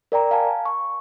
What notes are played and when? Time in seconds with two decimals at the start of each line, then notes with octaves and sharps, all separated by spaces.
0.12 A#4 D5 G5 A#5
0.31 F5 G#5 A5
0.65 C#6